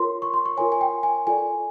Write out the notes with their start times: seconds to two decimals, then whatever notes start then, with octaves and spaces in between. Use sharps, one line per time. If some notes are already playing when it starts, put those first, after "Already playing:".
Already playing: F4 A#4 C#5 C6
0.22 C#6
0.34 C6
0.46 C#6
0.57 F4 A#4 C#5 G#5
0.72 G#5
0.81 G5
1.03 G#5
1.27 F4 A4 D5 G#5